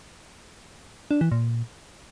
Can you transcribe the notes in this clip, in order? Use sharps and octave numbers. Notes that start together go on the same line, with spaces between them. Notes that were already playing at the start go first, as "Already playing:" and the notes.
D4
E3
A#2